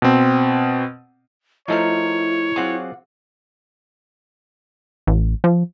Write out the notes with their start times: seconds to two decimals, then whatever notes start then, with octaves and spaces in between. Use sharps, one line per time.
0.02 B2 C4
1.68 F3 A3 D#4 E4 A4 A#4 C5 C#5
2.56 F#3 C4 F4 G#4 F#5 D6
5.07 A1
5.44 F3